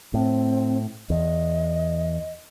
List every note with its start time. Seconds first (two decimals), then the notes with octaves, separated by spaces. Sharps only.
0.14 A2 C4
1.10 E2 D#5